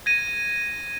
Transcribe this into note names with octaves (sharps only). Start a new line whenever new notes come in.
G#6 A#6 D#7